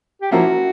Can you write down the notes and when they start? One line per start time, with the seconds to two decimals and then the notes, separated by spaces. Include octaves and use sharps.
0.22 G4
0.31 F3 A#3 C#4 E4 F#4